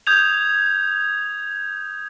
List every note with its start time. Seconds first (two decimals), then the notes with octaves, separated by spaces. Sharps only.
0.07 D#6 G6 G#6 F7